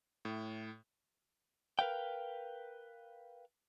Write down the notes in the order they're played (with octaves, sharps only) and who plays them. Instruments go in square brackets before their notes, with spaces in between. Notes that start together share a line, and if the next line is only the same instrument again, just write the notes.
[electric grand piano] A2
[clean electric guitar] A#4 B4 F5 G5